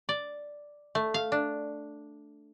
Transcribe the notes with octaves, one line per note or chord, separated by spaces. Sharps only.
D5
A3
F5
D4